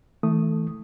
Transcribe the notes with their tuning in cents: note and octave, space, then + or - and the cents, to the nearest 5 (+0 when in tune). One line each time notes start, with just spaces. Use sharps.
E3 -25 A3 +0 D#6 +0